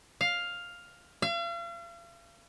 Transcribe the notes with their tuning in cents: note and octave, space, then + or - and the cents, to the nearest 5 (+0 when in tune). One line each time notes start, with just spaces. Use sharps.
F5 +5
F5 -40